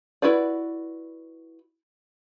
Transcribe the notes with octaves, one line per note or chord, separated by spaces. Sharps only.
E4 F#4 B4 D5